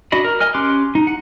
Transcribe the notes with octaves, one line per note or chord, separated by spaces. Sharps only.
D4 F#4 D#5 B5
A#4
D#5 G#5 F6
C#4 G4 C6 D6 F#6
D#4
F#5